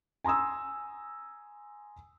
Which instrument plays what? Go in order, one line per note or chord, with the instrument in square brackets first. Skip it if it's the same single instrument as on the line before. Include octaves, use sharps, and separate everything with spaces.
[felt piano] G#5 A#5 C6 D#6 E6